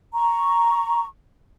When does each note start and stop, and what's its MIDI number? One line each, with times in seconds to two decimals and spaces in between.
0.14 1.05 82
0.14 1.05 85